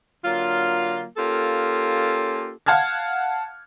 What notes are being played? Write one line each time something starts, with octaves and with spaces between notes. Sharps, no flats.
D3 F#3 A#3 F4
A#3 C#4 F4 G4 A4
F5 F#5 A5 F6 G#6